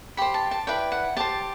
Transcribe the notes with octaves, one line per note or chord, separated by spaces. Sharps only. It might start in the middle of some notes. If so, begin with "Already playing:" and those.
G4 C5 B5
A5
A5
E4 B4 D5 G5
F#5
G4 C5 A5